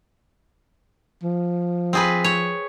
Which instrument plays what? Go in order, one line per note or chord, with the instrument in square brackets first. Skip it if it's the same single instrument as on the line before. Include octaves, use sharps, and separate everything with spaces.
[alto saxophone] F3
[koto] C4 G#4 B4
C#5